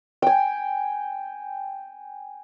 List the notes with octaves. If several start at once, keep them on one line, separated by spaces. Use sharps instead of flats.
G5 G#5